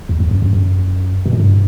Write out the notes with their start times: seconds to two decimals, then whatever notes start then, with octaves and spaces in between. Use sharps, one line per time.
0.09 E2
0.20 E2
0.31 F#2
0.42 F#2
0.53 F#2
1.26 B2
1.33 A#2
1.40 G2